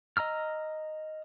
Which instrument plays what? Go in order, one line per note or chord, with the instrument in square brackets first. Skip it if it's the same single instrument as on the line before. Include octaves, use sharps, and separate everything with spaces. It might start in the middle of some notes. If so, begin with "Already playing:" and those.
[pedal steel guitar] D#5 A#5 E6 F6